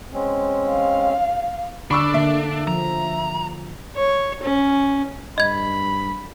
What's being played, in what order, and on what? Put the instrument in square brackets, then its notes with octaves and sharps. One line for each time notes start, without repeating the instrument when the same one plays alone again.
[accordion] G#3 C4 C#4
[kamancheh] F5
[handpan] D3 [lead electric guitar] D4 [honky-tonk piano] B5 C#6 E6
[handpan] D3 A#3 [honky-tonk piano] E5
[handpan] F3 [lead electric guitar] A#5
[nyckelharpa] C#5
C#4
[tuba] G2 [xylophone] D#5 G#6 [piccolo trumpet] B5